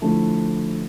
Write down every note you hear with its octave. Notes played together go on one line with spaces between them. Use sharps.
D3 F3 A3 E4